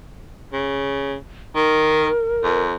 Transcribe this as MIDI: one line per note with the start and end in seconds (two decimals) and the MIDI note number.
0.53 1.15 49
1.56 2.09 51
1.56 2.62 70
2.43 2.75 41